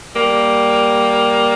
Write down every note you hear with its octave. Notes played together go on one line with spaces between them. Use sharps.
G3 A#3